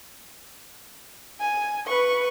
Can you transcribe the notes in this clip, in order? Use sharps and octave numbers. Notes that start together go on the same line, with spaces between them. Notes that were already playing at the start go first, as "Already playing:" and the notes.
G#5
B4 C#6